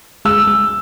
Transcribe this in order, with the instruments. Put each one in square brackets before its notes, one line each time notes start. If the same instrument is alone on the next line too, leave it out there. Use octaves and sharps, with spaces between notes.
[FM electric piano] G#3 [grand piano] E6
[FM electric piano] G#3